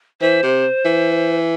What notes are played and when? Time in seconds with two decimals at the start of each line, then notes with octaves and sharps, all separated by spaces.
0.21 E3 C5
0.43 C3
0.85 E3